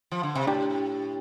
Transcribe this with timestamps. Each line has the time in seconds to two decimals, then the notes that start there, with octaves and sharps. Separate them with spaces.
0.11 F3
0.23 D3
0.35 C3
0.47 A2 D4 G4